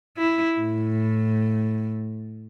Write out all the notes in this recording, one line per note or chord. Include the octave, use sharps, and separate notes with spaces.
E4
A2